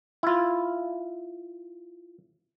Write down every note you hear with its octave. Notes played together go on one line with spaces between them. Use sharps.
E4 F4